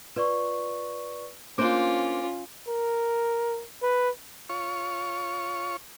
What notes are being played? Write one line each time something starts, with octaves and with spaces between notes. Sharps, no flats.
F4 B4 D5 C#6
A#3 C#4 D4 F4 C5 D6 D7
A#4
B4
F4 C#5 C#6